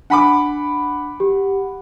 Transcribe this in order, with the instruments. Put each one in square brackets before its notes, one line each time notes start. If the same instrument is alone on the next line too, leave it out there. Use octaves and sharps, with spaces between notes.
[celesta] D4 G#5 B6 [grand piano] F#5 B5 D6
[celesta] G4